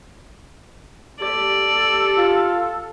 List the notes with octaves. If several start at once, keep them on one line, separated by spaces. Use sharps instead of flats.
G4 A4 D5
F4